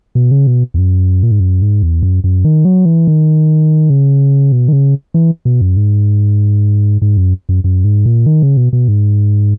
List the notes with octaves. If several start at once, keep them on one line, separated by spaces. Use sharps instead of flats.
B2
C#3
B2
E2
F#2
A#2
G#2
F#2
G#2
E2
F#2
F#2
D#3
F#3
E3
D#3
C#3
B2
D#3
C#3
E3
B2
F#2
G#2
G#2
F#2
F#2
F#2
G#2
A#2
D#3
C#3
B2
B2
G#2